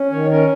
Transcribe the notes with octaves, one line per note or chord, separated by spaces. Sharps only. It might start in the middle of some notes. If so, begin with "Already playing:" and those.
Already playing: C#4
D#3 C#5
C#4 A#4